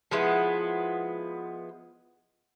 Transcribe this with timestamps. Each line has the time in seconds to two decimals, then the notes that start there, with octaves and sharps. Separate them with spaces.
0.11 F3 G#3 B3 E4